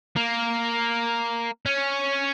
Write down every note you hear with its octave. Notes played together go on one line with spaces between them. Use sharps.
A#3
C#4